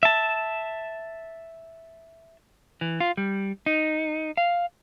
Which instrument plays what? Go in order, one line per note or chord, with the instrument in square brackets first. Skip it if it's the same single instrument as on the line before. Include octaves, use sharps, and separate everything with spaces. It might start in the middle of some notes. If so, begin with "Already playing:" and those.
[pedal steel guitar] E5 A5
[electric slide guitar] E3
F4
G3
D#4
F5